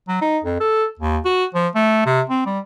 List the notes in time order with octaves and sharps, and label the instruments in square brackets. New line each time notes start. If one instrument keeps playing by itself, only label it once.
[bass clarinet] F#3
D#4
F2
A4
D#2
F#4
F3
A3
C3
C4
G3